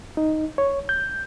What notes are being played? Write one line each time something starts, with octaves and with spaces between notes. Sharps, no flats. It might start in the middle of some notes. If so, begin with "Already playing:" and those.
D#4
C#5
G6